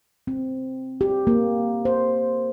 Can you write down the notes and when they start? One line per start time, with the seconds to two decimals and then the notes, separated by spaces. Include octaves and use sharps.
0.27 C4
1.01 G4
1.27 A#3
1.85 C5